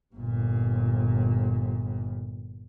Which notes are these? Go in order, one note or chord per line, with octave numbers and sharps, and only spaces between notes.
G1 A#2